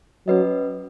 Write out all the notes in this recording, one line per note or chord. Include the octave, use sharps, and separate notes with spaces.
F#3 C#4 B4 D#5